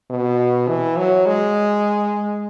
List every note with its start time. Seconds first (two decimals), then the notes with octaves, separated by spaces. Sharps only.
0.11 B2
0.69 E3
0.97 F#3
1.26 G#3